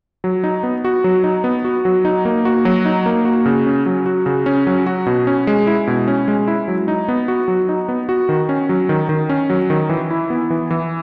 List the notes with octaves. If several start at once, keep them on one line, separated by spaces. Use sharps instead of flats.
F#3
D#4
B3
F#4
F#3
D#4
B3
F#4
F#3
D#4
A#3
F#4
F#3
D#4
A#3
F#4
C#3
C#4
F#3
F#4
C#3
C#4
F#3
F#4
B2
C#4
G#3
E4
B2
C#4
G#3
E4
F#3
D#4
B3
F#4
F#3
D#4
B3
F#4
D#3
C#4
F#3
D#3
D#3
C#4
F#3
D#3
E3
E4
B3
E3
E3